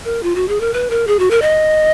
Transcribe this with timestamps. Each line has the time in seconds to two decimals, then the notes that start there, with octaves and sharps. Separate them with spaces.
0.05 A#4
0.23 F4
0.35 F#4
0.48 G#4
0.60 A#4
0.74 B4
0.90 A#4
1.07 G#4
1.19 F#4
1.31 A#4
1.42 D#5